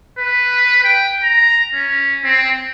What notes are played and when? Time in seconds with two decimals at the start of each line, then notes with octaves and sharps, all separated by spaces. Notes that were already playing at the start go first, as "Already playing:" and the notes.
0.19 B4
0.84 G5
1.24 A#5
1.75 C#4
2.24 C4